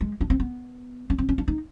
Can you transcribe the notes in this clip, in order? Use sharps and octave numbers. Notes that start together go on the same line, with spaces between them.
G#3
D4
C4
B3
C#4
C4
C#4
D4
D#4